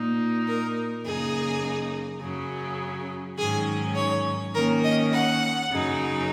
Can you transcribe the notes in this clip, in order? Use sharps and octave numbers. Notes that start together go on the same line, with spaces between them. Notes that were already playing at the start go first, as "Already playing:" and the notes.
Already playing: A#2 A#3 D#4
A#4
F#2 C#3 A#3 D#4 G#4
F#2 C#3 F#3 C#4
G#2 D#3 F#3 C#4 G#4
C#5
D#3 A#3 C#4 A#4
D#5
F#5
F#2 C#3 F#3 D#4